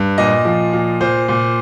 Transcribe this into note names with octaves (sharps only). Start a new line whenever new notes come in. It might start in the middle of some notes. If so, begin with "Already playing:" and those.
Already playing: G2
A#2 D#5
F3
A#2
A#2 C5
A#2